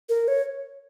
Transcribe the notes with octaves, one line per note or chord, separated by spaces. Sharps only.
A#4
C#5